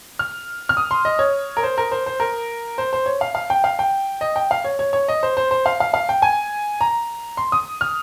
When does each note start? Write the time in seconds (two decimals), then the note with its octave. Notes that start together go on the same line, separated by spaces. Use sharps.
0.19 F6
0.69 F6
0.77 D#6
0.91 C6
1.05 D#5
1.19 C#5
1.57 A#4
1.63 C5
1.78 A#4
1.92 C5
2.06 C5
2.20 A#4
2.78 C5
2.93 C5
3.06 C#5
3.21 F5
3.35 F5
3.50 G5
3.64 F5
3.79 G5
4.21 D#5
4.36 G5
4.51 F5
4.64 C#5
4.79 C#5
4.93 C#5
5.08 D#5
5.23 C5
5.37 C5
5.51 C5
5.66 F5
5.80 F5
5.94 F5
6.09 G5
6.22 G#5
6.81 A#5
7.37 C6
7.52 D#6
7.81 F6